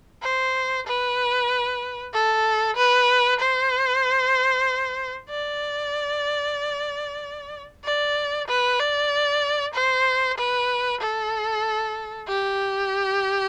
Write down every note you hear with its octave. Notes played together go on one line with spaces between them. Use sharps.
C5
B4
A4
B4
C5
D5
D5
B4
D5
C5
B4
A4
G4